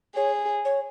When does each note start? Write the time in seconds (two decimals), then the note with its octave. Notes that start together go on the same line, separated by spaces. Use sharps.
0.16 G#4 C#5
0.65 C#5